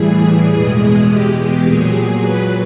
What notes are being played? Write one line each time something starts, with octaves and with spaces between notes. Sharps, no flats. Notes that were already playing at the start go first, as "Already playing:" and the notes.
Already playing: A2 E3 G3 G#4
E2 B2 G#3
G4
G4
A#2 F#3 G#4
B4